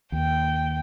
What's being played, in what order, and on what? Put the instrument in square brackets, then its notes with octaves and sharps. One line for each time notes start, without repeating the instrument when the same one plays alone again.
[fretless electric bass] D#2 [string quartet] G5